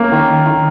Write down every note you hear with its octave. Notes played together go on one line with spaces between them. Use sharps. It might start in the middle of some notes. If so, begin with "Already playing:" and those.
Already playing: A#3 C#4
D#3
D#3